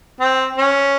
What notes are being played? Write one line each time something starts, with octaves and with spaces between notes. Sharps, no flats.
C4
C#4